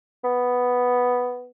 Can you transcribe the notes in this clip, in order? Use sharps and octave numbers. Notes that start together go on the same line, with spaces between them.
B3